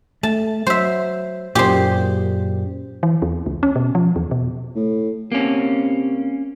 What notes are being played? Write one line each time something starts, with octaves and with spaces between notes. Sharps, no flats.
A3 A5
F#3 C5 E5
F#2 A#2 G4 G#4 C5
E3
E2
C#2
C#4
B2
F3
E2
B2
A2
C3 A#3 C#4